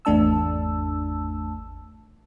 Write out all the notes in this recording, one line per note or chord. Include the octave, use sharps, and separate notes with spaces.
G#1 E2 A3 D4 A5 E6